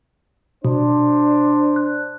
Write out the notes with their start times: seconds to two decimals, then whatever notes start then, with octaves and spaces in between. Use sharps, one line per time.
0.65 B2 D4 C5
1.76 F#6